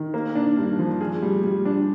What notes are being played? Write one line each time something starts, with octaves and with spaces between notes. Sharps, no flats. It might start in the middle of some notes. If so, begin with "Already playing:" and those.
Already playing: D#3
A#3
D4
G2
F3
G#4
G3
G3
D4